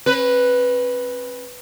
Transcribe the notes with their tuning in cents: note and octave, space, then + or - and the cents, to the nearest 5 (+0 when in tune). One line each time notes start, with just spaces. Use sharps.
C#4 -45 B4 +0